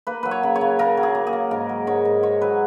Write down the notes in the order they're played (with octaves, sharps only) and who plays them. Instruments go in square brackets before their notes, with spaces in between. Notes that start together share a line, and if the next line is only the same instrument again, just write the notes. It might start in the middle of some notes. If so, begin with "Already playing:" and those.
[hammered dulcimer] A#3 B4
F#3 B4
C#5
C#3
C#5
C#3
C#3 A#4
F#3
G#4
A#3
G#4
A#3
G#2 A#4
F#3
G#2 C#5
G#2
G#2 C#5
F#3 B4